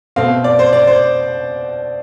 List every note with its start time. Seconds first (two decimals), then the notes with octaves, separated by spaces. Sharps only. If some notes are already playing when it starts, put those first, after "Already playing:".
0.16 B2 A3 C4 F5
0.44 D5
0.59 C5
0.73 D5
0.87 C5